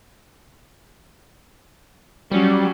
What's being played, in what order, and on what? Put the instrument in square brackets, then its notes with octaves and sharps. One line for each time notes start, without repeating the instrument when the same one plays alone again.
[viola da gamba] F#3 C#4 [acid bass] G3